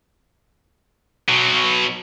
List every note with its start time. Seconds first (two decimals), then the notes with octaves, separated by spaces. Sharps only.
1.29 B2 F#3